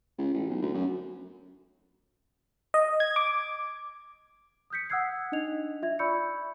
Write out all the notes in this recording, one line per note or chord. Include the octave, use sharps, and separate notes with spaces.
C#2
A1
B1
D2
F#2
D#5
G#6
D6
D#6 F6 G6 B6 C#7
F#5 D#6 E6 F#6 G#6 C7
D4 D#4 D#5 G#6 F7
F4 E5 G#6
D5 B5 C#6 E6 G6 C#7